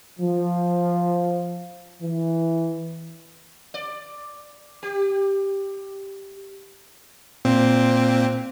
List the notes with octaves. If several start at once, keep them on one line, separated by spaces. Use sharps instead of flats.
F3
E3
D5
G4
A#2 C4